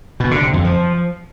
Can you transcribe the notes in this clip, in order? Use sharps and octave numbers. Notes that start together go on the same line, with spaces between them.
B2
D3
C3
F2
F3